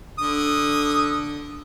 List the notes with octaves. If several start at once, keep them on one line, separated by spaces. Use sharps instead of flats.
D3 D#6